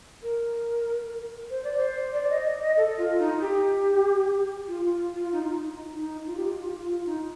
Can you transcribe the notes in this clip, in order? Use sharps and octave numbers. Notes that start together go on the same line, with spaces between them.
A#4
C5
D5
C5
D5
D#5
D#5
D#5
A4
F4
D#4
G4
F4
F4
F4
D#4
F4
D#4
D#4
D#4
F4
G4
F4
F4
F4
F4
D#4